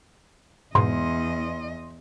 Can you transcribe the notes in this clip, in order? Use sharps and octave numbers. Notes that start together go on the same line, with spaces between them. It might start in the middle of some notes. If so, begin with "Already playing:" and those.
E2 G#2 B2 D#5 C6